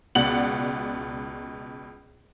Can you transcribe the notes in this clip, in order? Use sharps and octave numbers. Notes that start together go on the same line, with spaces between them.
C#2 B2 D5 F#5 F#7